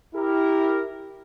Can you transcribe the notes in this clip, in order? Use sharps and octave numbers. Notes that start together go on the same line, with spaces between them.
E4 G4 A#4